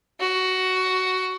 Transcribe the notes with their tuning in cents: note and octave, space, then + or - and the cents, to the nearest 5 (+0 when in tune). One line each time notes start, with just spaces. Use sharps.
F#4 +10